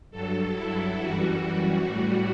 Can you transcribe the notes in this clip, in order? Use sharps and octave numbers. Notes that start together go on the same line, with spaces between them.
G2 F#3 A4
E4
F#2 E3 G3 F#4
A2 G3